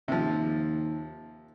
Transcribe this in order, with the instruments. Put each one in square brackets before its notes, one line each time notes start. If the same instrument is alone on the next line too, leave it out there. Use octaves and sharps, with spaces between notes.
[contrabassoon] D#2 [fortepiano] C3 F3